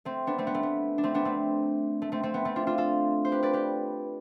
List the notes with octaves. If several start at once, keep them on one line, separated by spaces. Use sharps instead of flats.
A3 C4
B3 D4
A3 C4
B3
A3
B3
D4
A3 C4
B3 D4
A3 C4
A3
A3 C4
A3 C4
B3
A3 C4
D4 F4
D4 F4
F4 A4
C5
G4 B4
B4 D5
G4 B4